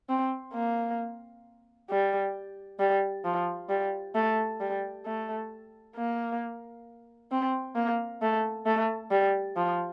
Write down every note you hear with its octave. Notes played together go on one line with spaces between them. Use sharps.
C4
A#3
G3
G3
F3
G3
A3
G3
A3
A#3
C4
A#3
A3
A3
G3
F3